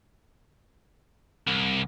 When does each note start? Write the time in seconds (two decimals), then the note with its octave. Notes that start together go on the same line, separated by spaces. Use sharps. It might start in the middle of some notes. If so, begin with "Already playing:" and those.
1.47 C2